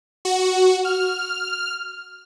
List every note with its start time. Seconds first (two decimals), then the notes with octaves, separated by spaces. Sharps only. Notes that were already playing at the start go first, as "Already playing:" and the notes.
0.25 F#4
0.85 F6